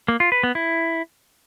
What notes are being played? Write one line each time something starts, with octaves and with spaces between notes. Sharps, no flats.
A#3
F4
B4
B3
E4